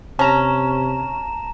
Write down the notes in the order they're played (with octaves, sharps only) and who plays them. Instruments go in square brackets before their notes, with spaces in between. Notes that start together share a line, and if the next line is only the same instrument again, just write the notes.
[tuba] C3 [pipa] C#4 [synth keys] A5 A#5 E7